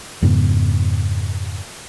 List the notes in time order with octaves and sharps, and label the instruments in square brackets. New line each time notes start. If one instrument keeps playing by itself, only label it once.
[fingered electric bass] F2 G#2 C#3 B3